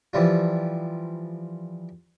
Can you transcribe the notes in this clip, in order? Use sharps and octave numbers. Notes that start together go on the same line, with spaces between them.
E3 F3 G3 F4